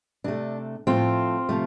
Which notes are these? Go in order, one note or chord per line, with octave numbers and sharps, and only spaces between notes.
C3 A3 D4
A2 F3 A3 C4 F4
C3 F3 A3